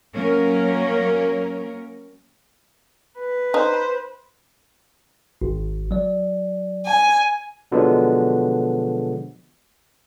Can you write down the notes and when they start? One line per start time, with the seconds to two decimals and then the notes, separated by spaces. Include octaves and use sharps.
0.14 F#3 A#3 C#4 A#4
3.19 B4
3.54 D#4 C5
5.42 G#1
5.91 F#3 D5
6.86 G#5
7.72 B2 D3 F3 F#3 G#3 B3